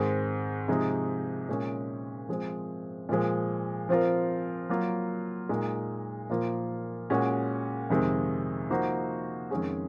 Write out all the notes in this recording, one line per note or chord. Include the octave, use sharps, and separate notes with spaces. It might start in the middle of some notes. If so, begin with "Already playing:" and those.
Already playing: G#2 D#3 G#3 C4
C3 F3 G#3 D#4
A#2 G#3 C#4
F3 G#3 C4
A#2 F3 G#3
F3 C4 F4 A#4
F#3 A#3 F4
A#2 G#3 D#4
A#2 F3 A#3 F4
A#2 G#3 C#4 F#4
F2 C3 D#3 G#3
F3 A#3 D#4 F#4 C5
F2 D#3 G#3 C#4 G#4